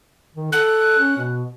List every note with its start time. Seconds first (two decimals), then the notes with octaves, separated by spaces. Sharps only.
0.35 D#3
0.52 A4 F#6
0.98 C#4
1.18 B2